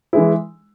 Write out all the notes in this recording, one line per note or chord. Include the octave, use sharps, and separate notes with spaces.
E3 G#3 E4